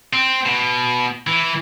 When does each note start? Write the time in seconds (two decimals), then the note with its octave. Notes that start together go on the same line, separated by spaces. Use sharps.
0.13 C4
0.45 B2
1.27 E3